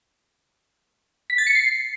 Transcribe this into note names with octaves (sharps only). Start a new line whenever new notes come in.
B6
A6
C#7
C7